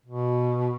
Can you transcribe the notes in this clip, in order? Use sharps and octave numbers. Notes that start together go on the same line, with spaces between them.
B2